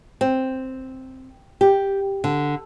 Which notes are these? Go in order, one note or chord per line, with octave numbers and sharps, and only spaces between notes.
C4
G4
D3